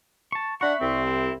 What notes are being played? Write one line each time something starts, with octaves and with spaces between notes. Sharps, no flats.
A5 C#6
D4 E5 F#5 B5 C#6
C2 C4
E4